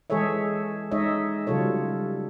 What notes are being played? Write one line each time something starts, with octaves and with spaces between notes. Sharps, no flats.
E3 G#3 G#4 A4 C#5 E5
G#3 D#4 C#5 D#5 E5
C#3 F#3 G3 F4 A4 C#5